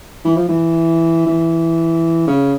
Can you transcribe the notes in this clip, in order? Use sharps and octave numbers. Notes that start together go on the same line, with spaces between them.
E3
F3
E3
E3
C#3